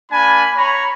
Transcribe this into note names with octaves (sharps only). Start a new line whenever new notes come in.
A#3 D4 G#5 B5
C#5 A#5 B5